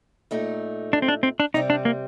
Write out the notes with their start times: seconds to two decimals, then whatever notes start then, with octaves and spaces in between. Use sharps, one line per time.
0.31 A#2 A3 D#4
0.93 D4
1.02 C4
1.08 D4
1.23 C4
1.40 D4
1.54 C3 G3 C4 D#4
1.70 D4
1.85 A#3